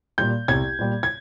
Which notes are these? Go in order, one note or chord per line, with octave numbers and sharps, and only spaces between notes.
A#2 G3 G6
C2 G#6
A#2 G3
G#6